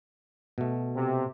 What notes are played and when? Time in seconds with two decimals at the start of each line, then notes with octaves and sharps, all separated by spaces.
0.58 B2 A3
0.96 C3